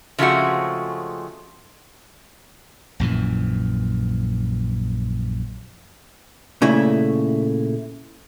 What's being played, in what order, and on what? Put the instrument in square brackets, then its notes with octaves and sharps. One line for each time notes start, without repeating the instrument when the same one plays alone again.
[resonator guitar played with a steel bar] C#3 F3 G#3 A3 C4 F#4
[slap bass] A#1 F#2 A#2 E3
[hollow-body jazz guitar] A#2 C#3 A3 E4